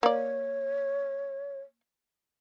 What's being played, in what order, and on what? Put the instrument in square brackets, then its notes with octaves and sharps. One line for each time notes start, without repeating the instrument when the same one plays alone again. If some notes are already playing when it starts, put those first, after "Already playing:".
[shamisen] A#3 D5 [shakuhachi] C#5